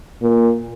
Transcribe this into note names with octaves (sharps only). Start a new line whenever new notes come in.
A#2